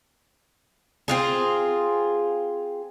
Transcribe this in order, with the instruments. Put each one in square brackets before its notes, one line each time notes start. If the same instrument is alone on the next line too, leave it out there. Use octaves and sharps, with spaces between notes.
[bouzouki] C4 F4 G#4